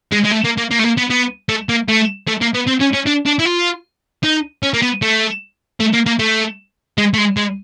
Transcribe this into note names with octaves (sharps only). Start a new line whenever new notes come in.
G#3
G#3
A3
A#3
A#3
A#3
A3
A#3
B3
B3
A3
A#3
A3
A3
A#3
B3
C4
C#4
C#4
D4
D4
E4
F4
D#4
C#4
A#3
B3
A3
A3
A#3
A#3
A3
G#3
A3
G#3
G#3